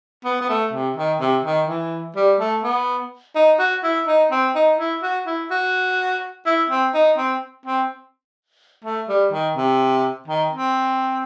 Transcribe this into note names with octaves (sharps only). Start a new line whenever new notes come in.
B3
B3
A3
C3
D#3
C3
D#3
E3
G3
A3
B3
D#4
F#4
E4
D#4
C4
D#4
E4
F#4
E4
F#4
E4
C4
D#4
C4
C4
A3
G3
D#3
C3
D#3
C4